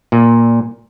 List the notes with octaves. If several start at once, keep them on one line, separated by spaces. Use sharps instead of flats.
A#2